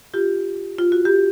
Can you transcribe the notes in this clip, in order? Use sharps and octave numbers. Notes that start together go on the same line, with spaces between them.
F4 G4
F4
F#4
G4